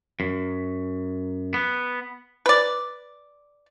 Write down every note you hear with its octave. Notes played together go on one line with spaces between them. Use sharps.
F#2
B3
B4 D5